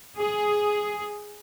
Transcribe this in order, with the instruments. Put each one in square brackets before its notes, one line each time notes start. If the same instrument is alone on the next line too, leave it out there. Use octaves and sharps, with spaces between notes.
[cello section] G#4